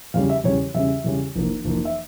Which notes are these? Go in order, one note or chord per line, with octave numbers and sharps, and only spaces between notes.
E2 C#3 G3 C#4 F5
E5
E2 C#3 G3 C#4 C#5
E2 C#3 G3 C#4 E5
E2 C#3 G3 C#4
F1 F2 E3 A#3
F1 F2 E3 A#3
E5